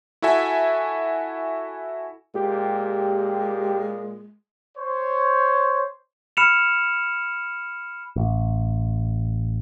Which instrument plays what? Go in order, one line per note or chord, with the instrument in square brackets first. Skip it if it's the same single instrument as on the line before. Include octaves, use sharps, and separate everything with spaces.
[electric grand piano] E4 F#4 A4 E5 G#5
[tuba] A#2 [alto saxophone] G#3 [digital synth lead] G4
[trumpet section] C5 C#5
[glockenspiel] B5 F6 C#7 E7 F7
[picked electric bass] A1